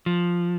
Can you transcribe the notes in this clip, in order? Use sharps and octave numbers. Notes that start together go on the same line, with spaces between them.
F3